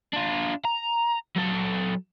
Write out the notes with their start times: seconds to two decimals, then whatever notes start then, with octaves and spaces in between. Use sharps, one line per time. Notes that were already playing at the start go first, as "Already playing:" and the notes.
0.13 D4 F4
0.65 A#5
1.36 F#3 A4